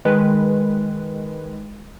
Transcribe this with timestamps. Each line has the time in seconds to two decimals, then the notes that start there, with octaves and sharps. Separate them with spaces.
0.05 D#3 G#3 B4